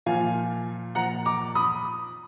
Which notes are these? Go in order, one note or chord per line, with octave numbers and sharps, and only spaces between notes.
A#2 F3 F5 G#5
A#2 F3 F#5 A#5
A#5 D6
B5 D#6